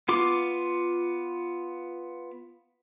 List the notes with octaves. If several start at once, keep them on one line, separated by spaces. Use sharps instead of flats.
B3 F4 D6